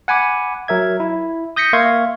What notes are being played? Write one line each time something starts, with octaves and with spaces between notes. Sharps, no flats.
F#5 G#5 B5 D6
F#3 A#4 E5 G#6
E4
D#6 G6 A#6 B6 C#7
A#3 E5 F5 C6 C#6 G#6